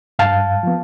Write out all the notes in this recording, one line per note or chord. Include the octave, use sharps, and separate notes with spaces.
G2 F5 A5
F3 B3